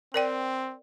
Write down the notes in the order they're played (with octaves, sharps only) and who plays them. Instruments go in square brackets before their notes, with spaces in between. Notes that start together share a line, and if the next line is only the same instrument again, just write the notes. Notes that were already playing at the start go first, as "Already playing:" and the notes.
[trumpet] C4 [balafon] A#4 D5 G5